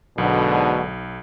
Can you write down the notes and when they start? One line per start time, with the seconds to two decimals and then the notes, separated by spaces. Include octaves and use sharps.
0.18 B1 G#2 B2 D3